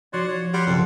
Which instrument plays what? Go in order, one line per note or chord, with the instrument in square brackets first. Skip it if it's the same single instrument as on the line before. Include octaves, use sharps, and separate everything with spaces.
[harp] F3 D#4 [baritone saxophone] F#4 [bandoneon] C#5 D5 C6
[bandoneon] C#5
[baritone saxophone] G3 [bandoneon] F#5 C6
[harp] F#1 B1 [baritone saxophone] F2